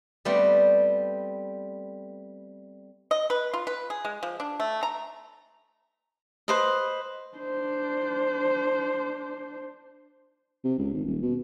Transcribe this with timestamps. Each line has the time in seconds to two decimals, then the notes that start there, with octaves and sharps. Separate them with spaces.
0.25 G3 A3 B3 C4 D5
3.11 D#5
3.30 B4
3.53 F4
3.67 B4
3.90 G#4
4.05 G#3
4.23 F3
4.40 D4
4.60 A3
4.83 A#5
6.48 B4 C5 D#5
7.37 D4 C5
10.64 C3
10.78 C#2
10.93 G#1
11.06 D#1
11.22 B2